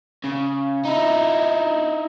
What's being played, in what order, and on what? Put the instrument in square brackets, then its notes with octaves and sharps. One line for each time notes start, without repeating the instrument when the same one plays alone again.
[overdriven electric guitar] C#3
D#4 E4